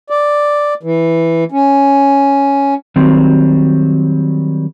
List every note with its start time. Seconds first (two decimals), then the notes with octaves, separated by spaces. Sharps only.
0.10 D5
0.83 E3
1.52 C#4
2.96 D#3 F#3 G3 C4